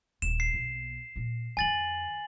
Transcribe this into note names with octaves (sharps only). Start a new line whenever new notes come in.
D#1 D4 E7
C7
B1 A#3
A#2 C#4
F2 D3 G#5 A6 F#7